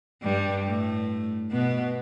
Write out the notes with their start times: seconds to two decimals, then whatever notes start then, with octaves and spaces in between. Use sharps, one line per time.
0.22 G2 G3
0.65 A2 A3
1.51 B2 B3